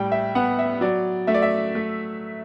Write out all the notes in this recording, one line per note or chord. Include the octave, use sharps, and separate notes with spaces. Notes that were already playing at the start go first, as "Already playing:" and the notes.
Already playing: A2 G3 G5
E5
B3 F#5
E5
F#3 D5
A3 E5
D5
E5
A3